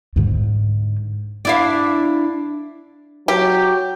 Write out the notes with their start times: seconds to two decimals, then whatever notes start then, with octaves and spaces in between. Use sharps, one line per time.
0.16 G#2 D3
1.45 D4 E4 F5
3.28 F#3 G4